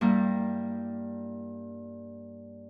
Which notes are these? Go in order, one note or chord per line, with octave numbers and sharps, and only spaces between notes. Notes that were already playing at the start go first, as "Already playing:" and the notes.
G2 G3 A#3 E4